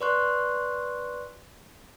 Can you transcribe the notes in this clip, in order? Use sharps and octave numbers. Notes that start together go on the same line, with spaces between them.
B4 D5 C6 C#6 F#6